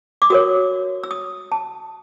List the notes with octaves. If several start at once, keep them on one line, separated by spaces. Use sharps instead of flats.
D6
F#4 A#4 C#5 D#6
E6
D#6
A5